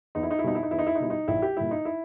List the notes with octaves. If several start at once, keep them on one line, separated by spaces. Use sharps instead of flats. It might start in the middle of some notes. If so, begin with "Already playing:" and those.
E2 D#4
E4
D#4
E4
B2 G3 D#4
E4
D#4
E2 E4
D#4
E4
D#4
B2 G3 E4
D#4
A#1 E4
G4
A#2 G3 E4
D#4
E4